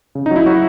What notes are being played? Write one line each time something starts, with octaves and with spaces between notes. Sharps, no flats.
C#3
D#4
F#3
E4
F#3 F#4